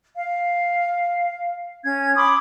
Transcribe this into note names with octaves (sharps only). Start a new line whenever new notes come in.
F5
C#4 G#6
B5 C6 D6 D#6